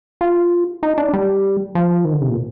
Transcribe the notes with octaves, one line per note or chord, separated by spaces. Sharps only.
F4
D#4
D4
G3
F3
D#3
D3
C3
A#2